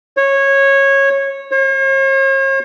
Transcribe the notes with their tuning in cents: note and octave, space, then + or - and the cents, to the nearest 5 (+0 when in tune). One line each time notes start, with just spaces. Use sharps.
C#5 -15
C#5 -45